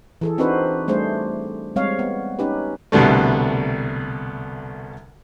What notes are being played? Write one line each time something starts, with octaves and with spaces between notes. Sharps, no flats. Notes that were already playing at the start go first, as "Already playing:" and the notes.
E3 G#4 A4
C4 D4 D#4 F#4 B4 C5
G3 A3 D4 G#4 C5
G3 G#3 C4 C#5 F5
B3
C#4 D#4 G4 B4
C2 B2 D3 G3 A3